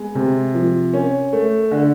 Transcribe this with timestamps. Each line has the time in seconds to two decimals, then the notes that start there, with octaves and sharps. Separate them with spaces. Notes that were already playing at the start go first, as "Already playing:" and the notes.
Already playing: G#3 B3
0.15 C3
0.54 F3
0.94 C#4
1.33 A3
1.71 D3